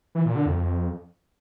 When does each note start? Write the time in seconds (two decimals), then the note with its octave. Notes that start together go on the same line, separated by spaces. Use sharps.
0.15 E3
0.25 A#2
0.36 D3
0.46 F2
0.56 F2